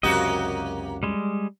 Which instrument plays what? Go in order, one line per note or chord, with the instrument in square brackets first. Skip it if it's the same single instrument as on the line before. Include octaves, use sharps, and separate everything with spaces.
[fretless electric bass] C#2 F#2 C3 [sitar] A#3 F#4 G4 [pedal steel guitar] D#5
[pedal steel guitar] G3 G#3